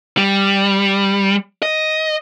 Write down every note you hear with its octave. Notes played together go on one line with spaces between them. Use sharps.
G3
D#5